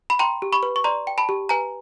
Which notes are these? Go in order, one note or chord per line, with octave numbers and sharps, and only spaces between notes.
B5
G5 A#5 C6
G4
B5 C#6
B4
C#6
D5 A#5 C6
G5
A5 B5
G4
B4 G#5 A#5